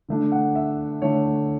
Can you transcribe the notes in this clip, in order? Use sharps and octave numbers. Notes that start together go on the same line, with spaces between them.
D3 A3 D4
F#5
E5
D3 A3 D4 C#5